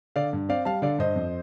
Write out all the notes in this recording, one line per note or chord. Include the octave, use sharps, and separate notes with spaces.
D3 D5 F5
G2
C4 D5 F5
G3 F5 A5
D3 D5 F5
G2 C5 D#5
F2